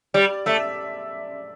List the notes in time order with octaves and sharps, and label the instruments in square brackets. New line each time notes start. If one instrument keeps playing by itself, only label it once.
[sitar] G3 [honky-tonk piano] D5
[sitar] A3 [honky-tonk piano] E5